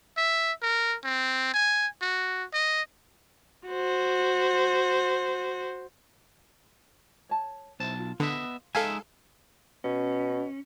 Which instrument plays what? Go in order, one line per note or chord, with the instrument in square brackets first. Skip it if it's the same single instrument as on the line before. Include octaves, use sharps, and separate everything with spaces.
[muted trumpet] E5
A#4
C4
G#5
F#4
D#5
[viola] F#4 C5
[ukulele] C#5 A5
[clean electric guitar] B1 A5 [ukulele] E4 C5
[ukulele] F4
[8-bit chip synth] D3 [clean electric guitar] B3 D#5 E5
[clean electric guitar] G#3 D#4 E5 [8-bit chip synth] A4 F5 G#5
[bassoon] B2 [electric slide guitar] C#4